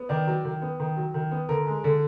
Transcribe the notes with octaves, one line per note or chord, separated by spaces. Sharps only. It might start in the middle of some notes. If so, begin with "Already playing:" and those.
Already playing: B3
D#3 D5
F#3
D#3
B3
D#3
F#3
D#3
B3
D3 A#4
G#3
D3